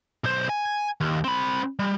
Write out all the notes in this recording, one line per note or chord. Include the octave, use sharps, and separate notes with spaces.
B1 C5
G#5
D#2
C4 B5
G3